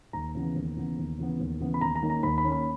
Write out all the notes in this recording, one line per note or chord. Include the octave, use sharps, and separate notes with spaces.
D#2 A#5
C#3 E3 B3
D#2
C#3 E3 B3
D#2
C#3 E3 B3
D#2
C#3 E3 B3
B5
D#2 A#5
A#5
D#3 A#3 C#4
A#5
D#2 B5
B5
D#3 A#3 C#4
B5